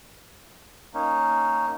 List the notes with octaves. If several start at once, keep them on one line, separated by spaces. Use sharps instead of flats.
A#3 C#4 D#4